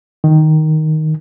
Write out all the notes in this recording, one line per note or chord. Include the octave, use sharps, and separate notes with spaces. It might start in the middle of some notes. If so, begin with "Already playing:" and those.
D#3